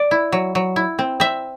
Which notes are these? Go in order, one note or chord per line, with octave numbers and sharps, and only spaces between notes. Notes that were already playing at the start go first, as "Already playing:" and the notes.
Already playing: D5
E4
F#3
F#3
E4
C4
C4 E5